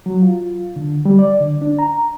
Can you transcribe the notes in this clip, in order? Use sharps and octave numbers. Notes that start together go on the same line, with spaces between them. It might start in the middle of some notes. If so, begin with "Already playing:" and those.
F#3
F4
D3
G3
D5
D3
D4
A#5